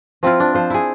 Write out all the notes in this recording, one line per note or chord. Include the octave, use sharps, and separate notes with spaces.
F3 C4 E4 F4
D4
F3 C5
E4 G#4